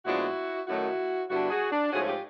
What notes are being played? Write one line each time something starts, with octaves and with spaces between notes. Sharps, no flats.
A#2 F3 G#3 B3 D4 E4 F#4
F#2 D#3 F#3 A3 E4 F#4
G2 D3 G3 B3 D4 E4 F#4
F#4 G#4
D4
G#2 F3 A3 C#4 F#4 G#4
G#4
F4 G4